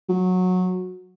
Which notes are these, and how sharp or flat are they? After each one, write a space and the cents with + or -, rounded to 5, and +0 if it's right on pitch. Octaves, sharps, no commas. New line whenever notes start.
F#3 -15